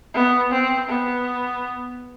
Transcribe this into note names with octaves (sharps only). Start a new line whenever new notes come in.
B3
C4
B3